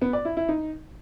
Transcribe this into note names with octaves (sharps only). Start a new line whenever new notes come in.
B3
D5
E4
E4
D#4